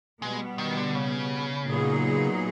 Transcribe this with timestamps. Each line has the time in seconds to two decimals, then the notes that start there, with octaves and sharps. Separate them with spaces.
0.21 B2 G3 G#3 B3
0.58 D#3
0.77 D3
0.95 C#3
1.68 A#2 F#3 B3 D#4 G#4